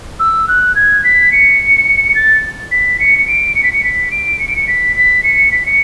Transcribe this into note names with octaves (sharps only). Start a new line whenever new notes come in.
E6
F#6
G#6
B6
C#7
A6
B6
C#7
C#7
D7
C#7
B6
C#7
B6
D7
C#7
D7
C#7
B6
B6
C#7
B6
C#7